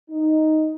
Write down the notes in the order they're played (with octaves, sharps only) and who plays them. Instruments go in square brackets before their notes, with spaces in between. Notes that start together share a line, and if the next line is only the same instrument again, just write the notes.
[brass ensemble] D#4